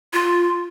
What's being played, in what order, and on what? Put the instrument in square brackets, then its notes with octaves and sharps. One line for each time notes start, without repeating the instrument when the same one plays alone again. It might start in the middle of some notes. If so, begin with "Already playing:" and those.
[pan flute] F4